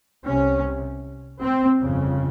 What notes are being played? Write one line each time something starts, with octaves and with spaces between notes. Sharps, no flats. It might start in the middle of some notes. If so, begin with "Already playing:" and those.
C2 C3 C#4
C4
G1 F2 C#3